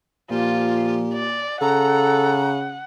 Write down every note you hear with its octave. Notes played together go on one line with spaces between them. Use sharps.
A#2 F3 F4 G4
D5
C#3 A4 F#5 A#5